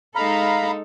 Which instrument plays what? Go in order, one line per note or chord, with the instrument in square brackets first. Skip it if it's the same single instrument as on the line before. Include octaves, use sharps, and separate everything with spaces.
[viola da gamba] G#3 D#4 A4 [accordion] F5 A#5 B5